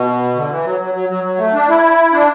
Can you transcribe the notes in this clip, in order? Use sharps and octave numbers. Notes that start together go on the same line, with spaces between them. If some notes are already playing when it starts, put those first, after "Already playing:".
Already playing: B2
D3
E3
F#3
F#3
F#3
F#3
F#3
A3
D4
E4
D4